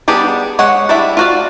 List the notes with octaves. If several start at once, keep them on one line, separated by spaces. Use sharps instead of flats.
G3 B3 D4 G4 G#4
G#3 C#5 F#5
G3 D4 E4 E5
F4 F#4 D5